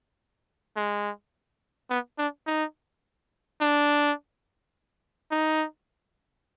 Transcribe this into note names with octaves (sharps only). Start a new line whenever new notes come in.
G#3
B3
D4
D#4
D4
D#4